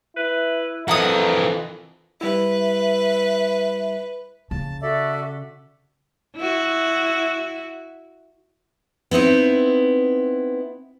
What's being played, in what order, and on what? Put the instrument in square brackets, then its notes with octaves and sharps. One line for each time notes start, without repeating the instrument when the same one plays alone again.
[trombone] E4 [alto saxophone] B4
[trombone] F2 [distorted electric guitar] E3 A#4 [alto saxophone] E4 [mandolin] F#5 A5 D#6
[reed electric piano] G3 E4 [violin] B4 [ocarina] E5
[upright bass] C#3 [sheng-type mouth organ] A5
[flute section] F#4 E5 [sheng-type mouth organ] A4 D5
[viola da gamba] E4 F#4
[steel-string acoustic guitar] B3 C4 D#4 E4